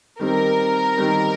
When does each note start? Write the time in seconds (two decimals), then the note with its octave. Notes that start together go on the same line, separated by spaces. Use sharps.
0.19 D#3 G3 C4 A#4
0.97 D#3 G3 C4